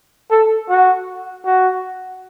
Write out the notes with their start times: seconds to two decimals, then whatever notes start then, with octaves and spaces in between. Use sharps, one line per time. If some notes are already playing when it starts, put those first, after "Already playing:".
0.31 A4
0.70 F#4
1.46 F#4